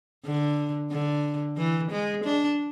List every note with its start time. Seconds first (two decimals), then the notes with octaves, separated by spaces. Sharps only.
0.25 D3
0.91 D3
1.57 E3
1.91 G#3
2.24 D4